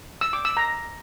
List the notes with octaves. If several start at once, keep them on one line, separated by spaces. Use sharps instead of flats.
E6
D6
E6
A#5